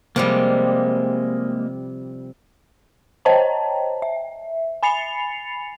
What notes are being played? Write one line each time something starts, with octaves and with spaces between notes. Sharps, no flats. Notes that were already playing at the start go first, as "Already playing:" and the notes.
C3 F3 G3 G#3 A#3
C5 C#5 D#5 G5 A5 A#5
E5
G#5 B5 A6 C7 C#7 F7